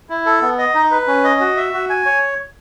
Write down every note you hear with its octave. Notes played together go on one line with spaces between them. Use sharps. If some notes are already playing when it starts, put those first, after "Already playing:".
E4
A4
B3
D#5
D#4
B4
C#4
D#5
F#4
E5
F#4
G#5
C#5